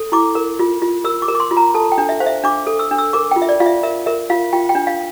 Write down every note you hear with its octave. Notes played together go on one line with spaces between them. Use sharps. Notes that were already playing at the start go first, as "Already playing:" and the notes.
Already playing: A4
E4 D6
A#4
F4
F4
A#4 E6
D6
A#4
D6
C6
F4
A#5
A4 A5
G5
D4
E5
C5 F5
E5
D4 D6
A4
E6
D4
E6
A#4 D6
F4 G5
E5
D5
F4 F5
E5
A#4 E5
A#4 E5
F4 F5
F4 G5
G5
D4
F5